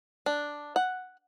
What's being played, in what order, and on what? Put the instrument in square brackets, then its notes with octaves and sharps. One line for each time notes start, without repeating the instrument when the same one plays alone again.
[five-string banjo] D4
F#5